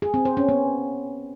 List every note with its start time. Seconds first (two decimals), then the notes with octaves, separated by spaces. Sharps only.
0.02 G#4
0.14 C4
0.25 C5
0.37 C#4
0.49 B3